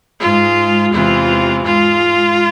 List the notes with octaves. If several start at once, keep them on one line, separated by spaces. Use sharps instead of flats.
G#2 G#3 F4
E2 C3 E3 G#3 F4
G#2 G#3 F4